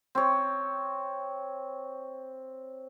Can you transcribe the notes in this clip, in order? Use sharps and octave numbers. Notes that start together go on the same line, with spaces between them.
C4 C#5